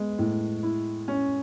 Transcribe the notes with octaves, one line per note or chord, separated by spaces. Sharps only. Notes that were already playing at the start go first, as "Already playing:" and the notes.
Already playing: G#3 B3
A2
E4
C#4